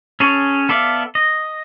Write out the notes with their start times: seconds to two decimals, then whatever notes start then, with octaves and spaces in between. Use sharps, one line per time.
0.20 C#4 G#4 A4 C#5
0.69 B3 A4 D5 E5 F5
1.15 D#5